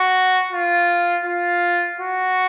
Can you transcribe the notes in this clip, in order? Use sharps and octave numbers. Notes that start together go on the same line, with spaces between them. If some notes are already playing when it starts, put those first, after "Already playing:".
Already playing: F#4
F4
F4
F#4